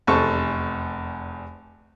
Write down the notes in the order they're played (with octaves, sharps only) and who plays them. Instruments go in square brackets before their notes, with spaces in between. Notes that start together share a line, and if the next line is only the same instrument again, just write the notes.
[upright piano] F1 E2 A4 C5 C#6